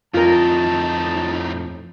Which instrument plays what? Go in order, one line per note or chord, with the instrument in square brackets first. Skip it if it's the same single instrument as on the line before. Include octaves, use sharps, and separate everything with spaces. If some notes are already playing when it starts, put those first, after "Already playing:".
[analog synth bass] F2 [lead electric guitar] A2 D#4 [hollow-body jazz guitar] F4 A#4 [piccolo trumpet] A5